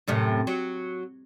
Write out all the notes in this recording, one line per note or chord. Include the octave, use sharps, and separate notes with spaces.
F#2 A2 C3
F#3